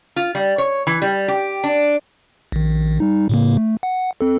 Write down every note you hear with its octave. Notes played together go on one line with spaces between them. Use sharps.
F4
G3
C#5
E3
G3
G4
D4
A#1 D#3
G3 D#4
A2 C#3 A#3
A3
F#5
C4 A4